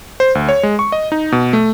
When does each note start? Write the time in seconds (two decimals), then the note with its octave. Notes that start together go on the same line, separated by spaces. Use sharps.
0.20 C5
0.35 D2
0.49 C#5
0.63 G#3
0.79 C#6
0.92 D#5
1.12 D#4
1.32 B2
1.53 A3